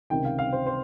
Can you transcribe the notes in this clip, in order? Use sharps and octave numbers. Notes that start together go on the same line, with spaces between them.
C#2 C3 D#3 G5
F5
F5
C5
C5